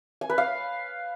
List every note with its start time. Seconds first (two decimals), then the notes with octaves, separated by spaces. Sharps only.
0.21 G#5
0.30 B4
0.38 F5